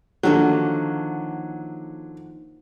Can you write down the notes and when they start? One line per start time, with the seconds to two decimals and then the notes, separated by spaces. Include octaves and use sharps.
0.23 D3 D#3 F3 F#3 A#3